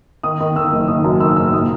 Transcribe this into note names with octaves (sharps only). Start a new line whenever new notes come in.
D#3 D#6
D#3
D#3 E6
F#1
D#3 D#6
F#2
D#3 E6
F#1 E6
A#2 D#6